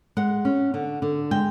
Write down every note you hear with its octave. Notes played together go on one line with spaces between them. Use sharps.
G#3 F#5
C#4
D3
D3
G#3 G5